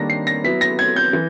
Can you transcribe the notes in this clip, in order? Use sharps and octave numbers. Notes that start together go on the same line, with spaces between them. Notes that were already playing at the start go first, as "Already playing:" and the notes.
Already playing: D#3 G3 A#3 D4 A#6
C7
A#6
F#3 B3 E4 B6
A#6
G#6
G6
E3